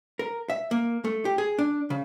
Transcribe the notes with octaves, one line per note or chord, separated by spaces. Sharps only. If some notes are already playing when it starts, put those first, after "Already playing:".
A#4
E5
A#3
A3
G4
G#4
D4
C#3